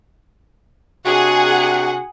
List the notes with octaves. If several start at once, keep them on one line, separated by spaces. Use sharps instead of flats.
C3 D4 F#4 G#4 F#5